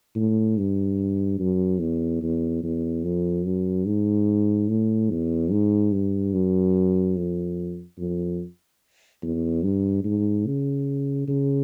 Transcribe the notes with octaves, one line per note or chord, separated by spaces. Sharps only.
A2
G2
F#2
E2
E2
E2
F2
F#2
G#2
A2
E2
G#2
G2
F#2
F2
F2
E2
G2
G#2
C#3
C#3